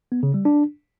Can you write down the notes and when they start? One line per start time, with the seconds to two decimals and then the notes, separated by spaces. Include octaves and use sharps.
0.12 B3
0.23 C#3
0.34 G3
0.45 D4